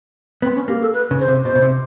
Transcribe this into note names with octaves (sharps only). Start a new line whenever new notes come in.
B3 C4
C#4
A#3 G4
A4
B4
C#3
C5
C3
B2 C5
B2
C3